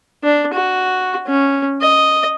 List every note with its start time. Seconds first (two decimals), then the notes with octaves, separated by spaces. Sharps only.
0.23 D4
0.54 F#4
1.27 C#4
1.82 D#5